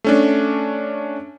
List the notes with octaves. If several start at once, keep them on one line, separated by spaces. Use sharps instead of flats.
A3 C#4 D4